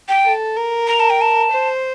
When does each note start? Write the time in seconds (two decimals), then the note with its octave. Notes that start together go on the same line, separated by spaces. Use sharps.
0.09 G5
0.25 A4
0.56 A#4
0.87 A#5
1.00 A5
1.10 G5
1.21 A5
1.51 C5